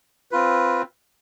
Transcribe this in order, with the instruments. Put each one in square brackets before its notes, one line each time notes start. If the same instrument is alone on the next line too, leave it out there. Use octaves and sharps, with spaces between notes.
[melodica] C4 F4 B4